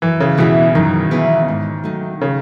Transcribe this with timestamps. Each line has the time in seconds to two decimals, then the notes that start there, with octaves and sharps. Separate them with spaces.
0.02 F#2 E3
0.20 C#3
0.38 B2 E3 B3 E4 G#4
0.75 F#2 D#3
1.11 E3 B3 E4 G#4
1.48 G#2
1.84 F#3 A3 D#4
2.21 C#3